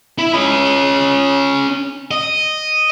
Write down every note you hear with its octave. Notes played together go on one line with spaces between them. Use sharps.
E4
C#4 D#5
D#5